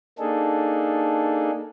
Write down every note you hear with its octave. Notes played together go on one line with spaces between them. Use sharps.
A#3 D4 D#4 G#4 A4